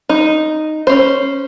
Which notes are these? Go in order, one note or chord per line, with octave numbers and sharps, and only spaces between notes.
D#4
C#4 C5